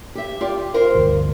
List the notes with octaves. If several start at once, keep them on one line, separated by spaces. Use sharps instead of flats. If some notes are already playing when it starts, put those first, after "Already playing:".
G4 E5
F4 G4 D5
F4 A#4 C5
G1 D2